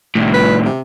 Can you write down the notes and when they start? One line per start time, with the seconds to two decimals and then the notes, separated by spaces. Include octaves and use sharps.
0.15 C2 A2
0.34 B4
0.65 C3